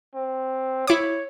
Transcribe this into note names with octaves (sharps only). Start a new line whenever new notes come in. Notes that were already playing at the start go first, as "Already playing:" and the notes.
C4
E4 C#5 D6